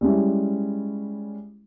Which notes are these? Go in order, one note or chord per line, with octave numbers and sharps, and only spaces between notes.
G3 G#3 C#4 E4